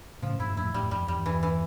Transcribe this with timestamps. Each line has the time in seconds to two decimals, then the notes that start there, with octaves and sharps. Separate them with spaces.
0.22 A2 C#3 F3
0.39 G2 A#2 E4
0.57 F2 A2 E4
0.74 F2 A2 G3
0.83 G2
0.91 F2 G3
1.08 E2 G2 G3
1.26 E3
1.43 E3